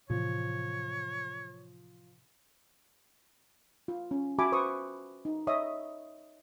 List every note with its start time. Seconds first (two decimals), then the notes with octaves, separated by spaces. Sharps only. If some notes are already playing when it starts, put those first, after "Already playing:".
0.10 A2 C3 E3 F3 C#5
3.88 F4
4.11 C#4
4.39 F#4 E5 G#5 A5 B5 D6
4.52 B4 C5 C#6 D#6
5.25 D#4
5.47 C#5 D#5 E5 D#6